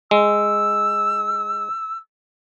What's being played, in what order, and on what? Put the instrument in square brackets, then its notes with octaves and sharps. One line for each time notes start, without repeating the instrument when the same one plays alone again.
[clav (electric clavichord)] G#3 [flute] E6